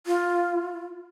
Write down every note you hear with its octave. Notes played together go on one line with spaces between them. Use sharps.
F4